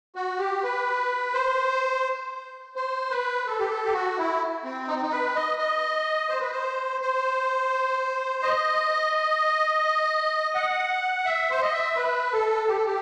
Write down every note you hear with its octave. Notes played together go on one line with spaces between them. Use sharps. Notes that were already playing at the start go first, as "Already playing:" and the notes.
F#4
G4
B4
C5
C5
B4
A4
G4
A4
G4
F#4
E4
C4
D#4
C4
D#4
B4
D#5
D#5
C5
B4
C5
C5
D#5
F#5
E5
C5
D#5
E5
B4
A4
G4
A4
G4